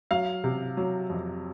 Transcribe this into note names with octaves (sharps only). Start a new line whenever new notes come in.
F#3 F5
C3
F#3
F2